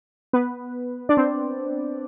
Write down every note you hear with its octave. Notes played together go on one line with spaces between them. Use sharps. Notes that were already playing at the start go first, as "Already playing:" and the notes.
B3 B4
D4 D5
C4 C5